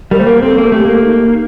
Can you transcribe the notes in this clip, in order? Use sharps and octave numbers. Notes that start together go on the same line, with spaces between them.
G3 A#4
A3 C5
A#3 A#4
C4 A4
A#3
A3 G4
A#3
D#4